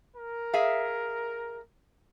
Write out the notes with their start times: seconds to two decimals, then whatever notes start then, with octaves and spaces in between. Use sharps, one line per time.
0.17 A#4
0.54 G#4 E5 F5